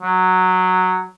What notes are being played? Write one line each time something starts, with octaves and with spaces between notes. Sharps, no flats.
F#3